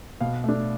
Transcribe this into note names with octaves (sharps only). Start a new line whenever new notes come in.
B2 F5
A3 D4